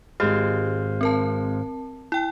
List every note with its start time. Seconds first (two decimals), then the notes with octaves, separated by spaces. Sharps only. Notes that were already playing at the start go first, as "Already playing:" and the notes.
0.20 G#1 G#3 G4 C5 F5
1.01 C4 A#4 A5
2.12 E4 G5